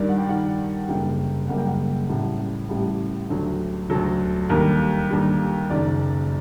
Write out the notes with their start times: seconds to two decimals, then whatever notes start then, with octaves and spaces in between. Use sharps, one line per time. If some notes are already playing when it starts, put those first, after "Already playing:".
Already playing: G2 D#3 G3 A#4 D5
0.09 F#5
0.18 G5
0.28 G2 D#3 G3 F#5
0.89 F#1 F#2 D3 G3 A#3 G5
1.48 F#1 F#2 D3 G3 A#3 F#5
1.58 G5
1.66 F#5
2.09 A1 A2 G3
2.69 A1 A2 G3 G4
3.30 D2 D3 F#3
3.90 D2 D3 F#3 A4
4.49 D#2 D3 G3 A#4
5.10 D#2 D3 G3
5.70 F#1 F#2 D#3 D5